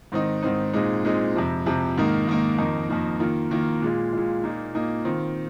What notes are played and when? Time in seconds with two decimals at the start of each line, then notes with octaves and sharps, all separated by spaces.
0.12 G#2 D#3 C4 D#4
0.43 G#2 D#3 C4 D#4
0.73 A#2 G#3 C4 D#4
1.05 A#2 G#3 C4 D#4
1.35 F2 C3 F3
1.66 F2 C3 F3
1.97 G#2 D#3 A#3 D#4
2.28 G#2 D#3 A#3 D#4
2.58 F2 D#3 A#3 D#4
2.89 F2 D#3 A#3 D#4
3.20 D#3 A#3 F4
3.51 D#3 A#3 F4
3.82 A#2 G#3 F4
4.13 A#2 G#3 F4
4.44 A#2 A#3 D#4
4.75 A#2 A#3 D#4
5.05 D#3 C4 F4